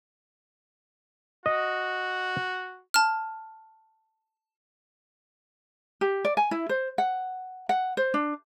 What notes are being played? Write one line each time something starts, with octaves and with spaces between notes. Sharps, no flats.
F#4 D#5
A5 F6
G4
D5
G#5
E4
C5
F#5
F#5
C5
D4